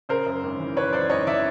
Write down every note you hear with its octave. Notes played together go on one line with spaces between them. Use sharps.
C#3 A#4 C5
F#2
G#1
E3
C#3 B4 C#5
F#2 C5 D5
G#1 C#5 D#5
E3 D5 E5